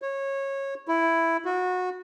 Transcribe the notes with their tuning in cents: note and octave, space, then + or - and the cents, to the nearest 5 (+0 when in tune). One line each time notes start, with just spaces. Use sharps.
C#5 -20
E4 +5
F#4 -25